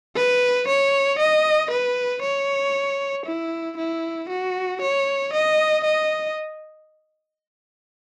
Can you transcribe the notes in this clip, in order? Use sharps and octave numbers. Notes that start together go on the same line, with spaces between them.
B4
C#5
D#5
B4
C#5
E4
E4
F#4
C#5
D#5
D#5